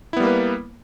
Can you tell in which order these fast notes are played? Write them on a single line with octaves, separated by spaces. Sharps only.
E4 B3 G3 A#3 B4